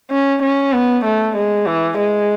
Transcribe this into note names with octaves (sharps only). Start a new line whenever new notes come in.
C#4
C#4
B3
A3
G#3
E3
G#3